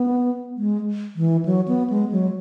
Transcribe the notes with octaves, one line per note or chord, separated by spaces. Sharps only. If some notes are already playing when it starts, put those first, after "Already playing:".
Already playing: B3
G#3
E3
F#3
B3
G#3
F#3